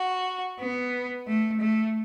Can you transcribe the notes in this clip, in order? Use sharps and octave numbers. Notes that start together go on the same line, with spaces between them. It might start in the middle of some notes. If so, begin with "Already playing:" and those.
Already playing: F#4
B3
A3
A3